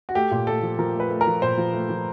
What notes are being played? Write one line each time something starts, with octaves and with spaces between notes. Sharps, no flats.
F#4
A3 G4
A#2
A3 A4
F3
F3 A#4
A3
B4
A3
A#4
F3
A#2 C5
F3
A3
F3